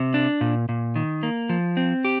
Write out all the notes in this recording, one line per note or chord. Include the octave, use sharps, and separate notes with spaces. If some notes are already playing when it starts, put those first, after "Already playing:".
Already playing: C3
D4
A#2
A#2
D#3
A#3
F3
C4
G4